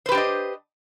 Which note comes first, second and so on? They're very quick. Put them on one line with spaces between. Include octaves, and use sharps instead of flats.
C5 B4 G4 D4 D#5